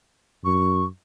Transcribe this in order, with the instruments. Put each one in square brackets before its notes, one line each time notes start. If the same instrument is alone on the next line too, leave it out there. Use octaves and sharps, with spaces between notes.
[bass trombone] F#2 [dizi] C#6